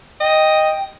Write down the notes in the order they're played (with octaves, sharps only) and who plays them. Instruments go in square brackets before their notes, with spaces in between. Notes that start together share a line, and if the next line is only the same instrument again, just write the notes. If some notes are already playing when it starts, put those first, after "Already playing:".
[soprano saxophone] D#5 [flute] G5